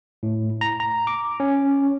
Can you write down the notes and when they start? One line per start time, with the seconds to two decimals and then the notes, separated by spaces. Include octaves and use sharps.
0.23 A2
0.61 A#5
0.80 A#5
1.07 D6
1.40 C#4